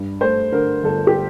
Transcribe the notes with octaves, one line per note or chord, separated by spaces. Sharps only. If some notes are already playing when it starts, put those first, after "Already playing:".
Already playing: G2
A3 C5
D3 A#4
G1 A4
G4